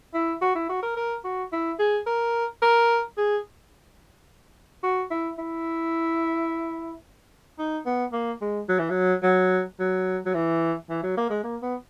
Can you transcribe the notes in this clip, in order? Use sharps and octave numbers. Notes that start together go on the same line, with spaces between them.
E4
F#4
E4
F#4
A#4
A#4
F#4
E4
G#4
A#4
A#4
G#4
F#4
E4
E4
D#4
B3
A#3
G#3
F#3
E3
F#3
F#3
F#3
F#3
E3
E3
F#3
A#3
G#3
A#3
B3